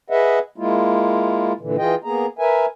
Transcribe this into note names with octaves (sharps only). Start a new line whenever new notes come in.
G#4 B4 D#5 E5 F#5
G#3 A#3 E4 F4
A#2 D3 E3
E3 F4 G#4 D#5 G5
A#3 B3 G#4 A#5
A#4 B4 E5 G#5